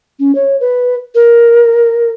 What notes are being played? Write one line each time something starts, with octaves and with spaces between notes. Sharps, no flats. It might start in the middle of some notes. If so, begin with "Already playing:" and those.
C#4
C#5
B4
A#4